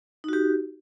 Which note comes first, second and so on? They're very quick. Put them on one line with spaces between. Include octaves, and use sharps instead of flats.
D#4 F#4 G4